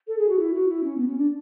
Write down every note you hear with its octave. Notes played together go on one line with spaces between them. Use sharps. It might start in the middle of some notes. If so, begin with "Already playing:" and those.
A4
G#4
F#4
E4
F#4
E4
C#4
B3
C#4
D4